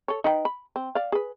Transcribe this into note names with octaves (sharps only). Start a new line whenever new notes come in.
A4 C#5
D#4 B4 G5
B5
C4
D5 F5
G#4 B4